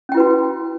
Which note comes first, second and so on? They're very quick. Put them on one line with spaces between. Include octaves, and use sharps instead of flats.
C#4 G5 E4 B4 F#4